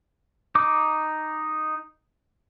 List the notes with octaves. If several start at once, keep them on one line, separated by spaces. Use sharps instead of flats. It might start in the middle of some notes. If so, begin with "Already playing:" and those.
D#4 D6